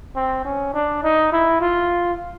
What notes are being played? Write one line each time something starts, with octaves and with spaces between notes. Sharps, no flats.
C4
C#4
D4
D#4
E4
F4